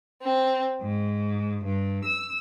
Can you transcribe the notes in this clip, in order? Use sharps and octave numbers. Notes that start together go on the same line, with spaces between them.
C4
G#2
G2
E6